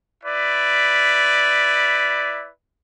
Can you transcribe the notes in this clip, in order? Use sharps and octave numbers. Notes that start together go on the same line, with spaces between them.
E4 B4 D5